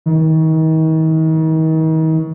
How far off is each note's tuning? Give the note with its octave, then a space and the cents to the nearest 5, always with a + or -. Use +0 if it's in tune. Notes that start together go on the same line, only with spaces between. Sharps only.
D#3 +40